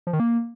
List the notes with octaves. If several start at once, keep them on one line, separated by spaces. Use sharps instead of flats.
F3
D#3
A#3